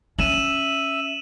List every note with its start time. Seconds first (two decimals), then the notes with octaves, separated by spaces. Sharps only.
0.19 C#4 E5 D#7 E7 F#7